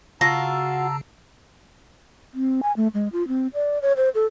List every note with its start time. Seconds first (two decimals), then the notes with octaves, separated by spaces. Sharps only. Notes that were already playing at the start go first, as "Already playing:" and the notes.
0.21 C#3 F4 F#4 A5 A#5 E6 A#6
2.34 C4
2.63 G#5
2.77 A3
2.94 G#3
3.13 F4
3.28 C4
3.54 D5
3.82 C#5
3.97 C5
4.15 A4